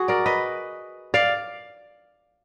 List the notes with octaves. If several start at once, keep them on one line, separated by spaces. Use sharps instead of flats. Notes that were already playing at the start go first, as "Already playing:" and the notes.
Already playing: F#4 G#4
A#4 D5
B4 D#5
D5 F5